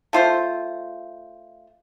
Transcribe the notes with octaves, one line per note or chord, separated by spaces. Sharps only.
A3 F4 C5